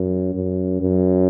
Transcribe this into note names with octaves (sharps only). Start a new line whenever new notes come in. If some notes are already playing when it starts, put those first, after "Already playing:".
Already playing: F#2
F#2
F#2